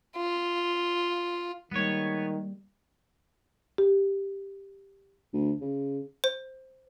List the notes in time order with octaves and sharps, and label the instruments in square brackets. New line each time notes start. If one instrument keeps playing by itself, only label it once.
[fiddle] F4
[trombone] D#3 [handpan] G3 G#3 A#3 [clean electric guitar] B3 C#5
[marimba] G4
[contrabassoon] D2
C#3
[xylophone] C5